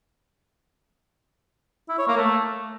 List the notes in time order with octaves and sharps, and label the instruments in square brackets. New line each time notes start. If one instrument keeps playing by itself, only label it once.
[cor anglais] E4
C#5
A#3
A3